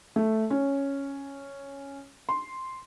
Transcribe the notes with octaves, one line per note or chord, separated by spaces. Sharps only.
A3
C#4
C6